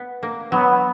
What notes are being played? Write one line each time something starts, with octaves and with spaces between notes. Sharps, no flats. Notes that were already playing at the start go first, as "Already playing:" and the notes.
Already playing: B3
A#3
F#3 B3